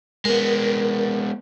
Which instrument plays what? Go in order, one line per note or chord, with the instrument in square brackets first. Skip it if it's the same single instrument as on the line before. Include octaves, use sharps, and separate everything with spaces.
[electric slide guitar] G#3 B3 [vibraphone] A#4